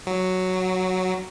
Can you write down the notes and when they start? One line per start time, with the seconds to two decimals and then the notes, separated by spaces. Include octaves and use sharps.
0.07 F#3